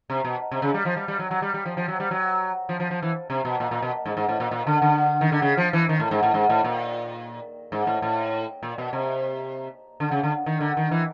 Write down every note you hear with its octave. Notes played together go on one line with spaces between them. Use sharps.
C3
B2
C3
C#3
G3
F3
G3
G3
F#3
F#3
G3
G3
F3
F3
F#3
G3
F#3
F3
F3
F3
E3
C3
B2
A#2
A#2
B2
G#2
G#2
A2
A#2
A#2
D3
D3
D#3
D3
C#3
F3
E3
D#3
A2
G#2
A2
G#2
A2
A#2
G#2
A2
A2
A#2
B2
C3
D3
C#3
D3
D#3
D3
D#3
E3